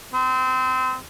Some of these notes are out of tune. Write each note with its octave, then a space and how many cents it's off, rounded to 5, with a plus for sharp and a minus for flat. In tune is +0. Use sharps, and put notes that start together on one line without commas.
C4 -25